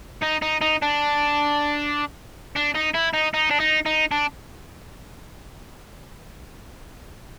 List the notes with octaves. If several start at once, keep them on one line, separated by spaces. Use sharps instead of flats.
D#4
D#4
D#4
D4
D4
D#4
E4
D#4
D#4
D4
D#4
D#4
D4